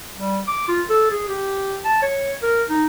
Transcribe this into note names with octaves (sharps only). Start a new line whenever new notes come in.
G3
D6
F4
A4
G#4
G4
A5
C#5
A#4
D#4